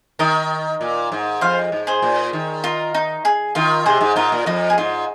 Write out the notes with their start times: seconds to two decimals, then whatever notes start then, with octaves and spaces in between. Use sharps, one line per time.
0.19 D#3 A#4 D#5
0.81 A#2
1.12 G#2
1.41 F2 C5 F5
1.72 G#2
1.87 G#4 C5
2.02 A#2
2.33 D#3
2.64 F4 A#4
2.94 D#4
3.25 G#4
3.55 D#3 F4 A#4
3.86 C3 G#4 C5
4.01 G#2
4.16 G#2 F4 A#4
4.32 A#2
4.46 F2 D#4
4.70 G#4
4.78 G#2 F4